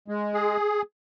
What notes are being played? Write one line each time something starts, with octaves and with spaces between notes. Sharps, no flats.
G#3
G#4